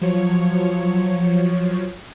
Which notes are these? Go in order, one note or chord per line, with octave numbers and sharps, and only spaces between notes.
F3 F#3 C#5